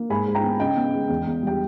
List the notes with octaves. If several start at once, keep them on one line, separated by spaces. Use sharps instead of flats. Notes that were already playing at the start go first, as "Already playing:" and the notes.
Already playing: A#3
G#2 G#5 B5
G#2
G5 A#5
B3
C#3 D#5 G5
B3
G#3
E2
E2
G3 G5